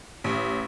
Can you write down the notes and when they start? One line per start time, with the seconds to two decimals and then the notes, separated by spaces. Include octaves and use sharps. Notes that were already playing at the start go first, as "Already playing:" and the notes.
0.24 A1